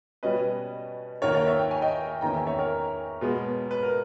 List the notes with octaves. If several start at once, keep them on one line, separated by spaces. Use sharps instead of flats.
B2 G3 C#4 B4 D#5
D#2 D#3 A#3 A#4 C#5
A#4 C#5
C#5 E5
G5
G#5
D#5 G5
E2 D#3 A#3 C#4 G5 A#5
E5 G#5
C#5 E5
A#4 C#5
B2 G#3 B3
B4
A#4